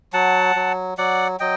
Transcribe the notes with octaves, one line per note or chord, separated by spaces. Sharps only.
F#3 F#5 A5
F#3
F#3 D5 F#5
F#3 D#5 G5